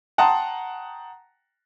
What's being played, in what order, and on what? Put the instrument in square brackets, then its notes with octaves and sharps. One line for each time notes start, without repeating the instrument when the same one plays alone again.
[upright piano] F#5 G5 A5 A#5 C6 D#6